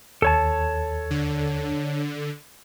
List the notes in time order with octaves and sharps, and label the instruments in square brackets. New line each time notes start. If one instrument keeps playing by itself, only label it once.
[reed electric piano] D#2 [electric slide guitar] A4 C#5 A5
[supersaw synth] D3